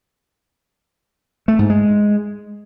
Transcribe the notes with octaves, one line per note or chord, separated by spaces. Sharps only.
A3
G#2
G#3